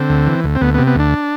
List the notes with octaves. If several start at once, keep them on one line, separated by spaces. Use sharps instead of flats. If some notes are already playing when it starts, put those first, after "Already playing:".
Already playing: D3 C4
D2
E3
D2
C4
D2 B3
B3
C3
B3
D2 D4